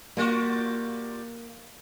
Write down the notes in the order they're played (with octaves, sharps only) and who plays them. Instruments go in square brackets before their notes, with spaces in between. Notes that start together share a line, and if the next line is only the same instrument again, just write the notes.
[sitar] G3 F4 F#4 [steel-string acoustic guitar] A#3